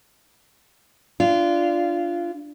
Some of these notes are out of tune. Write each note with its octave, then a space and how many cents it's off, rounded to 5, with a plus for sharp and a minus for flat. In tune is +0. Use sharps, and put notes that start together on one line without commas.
D4 +0 F4 -20